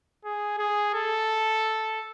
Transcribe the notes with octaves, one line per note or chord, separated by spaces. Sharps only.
G#4
G#4
A4